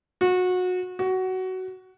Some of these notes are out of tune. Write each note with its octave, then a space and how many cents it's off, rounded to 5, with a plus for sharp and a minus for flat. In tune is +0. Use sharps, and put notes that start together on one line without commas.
F#4 -25
F#4 +15